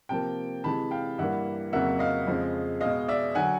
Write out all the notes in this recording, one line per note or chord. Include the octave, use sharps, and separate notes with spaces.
C3 F3 A#3 G5 A5
C3 E3 G#3 A5 B5
F5 G5
G2 E3 G3 A#3 E5 F#5
F2 C#3 F#3 A#3 E5 F#5
D#5 F5
F2 C#3 F3 G#3
B2 G#3 D#5 F5
D5 E5
D3 F#3 F#5 G#5